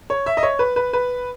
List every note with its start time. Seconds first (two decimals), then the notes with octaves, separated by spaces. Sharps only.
0.10 C#5
0.26 E5
0.37 D#5
0.43 C#5
0.59 B4
0.76 B4
0.93 B4